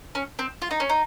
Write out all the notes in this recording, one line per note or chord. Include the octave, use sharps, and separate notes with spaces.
C#4
C4
F4
D#4
C#4
D#4